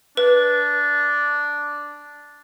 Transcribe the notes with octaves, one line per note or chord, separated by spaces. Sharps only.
D4 B4